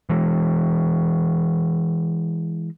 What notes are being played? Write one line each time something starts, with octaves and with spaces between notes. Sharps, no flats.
E3 G#3